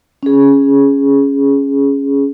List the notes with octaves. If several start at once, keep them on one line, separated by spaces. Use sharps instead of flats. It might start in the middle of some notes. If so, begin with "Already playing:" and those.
C#4 G#4